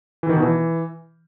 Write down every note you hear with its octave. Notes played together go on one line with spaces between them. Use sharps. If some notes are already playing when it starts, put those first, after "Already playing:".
E3
D#3
B2
E3